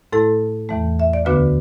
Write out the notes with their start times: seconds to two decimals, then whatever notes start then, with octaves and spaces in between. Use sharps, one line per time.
0.13 A2 A3 E4 A4
0.69 E2 E3 A3
1.00 E5
1.13 D5
1.25 D2 D3 B3 D4 F#4 B4